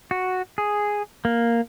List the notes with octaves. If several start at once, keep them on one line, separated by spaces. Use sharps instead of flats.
F#4
G#4
A#3